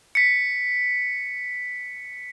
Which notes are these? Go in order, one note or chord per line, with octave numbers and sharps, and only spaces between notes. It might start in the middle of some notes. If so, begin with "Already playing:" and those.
B6 C#7